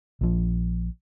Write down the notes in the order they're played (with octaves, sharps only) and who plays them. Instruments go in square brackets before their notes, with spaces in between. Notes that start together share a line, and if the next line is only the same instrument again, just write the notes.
[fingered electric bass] A#1 F3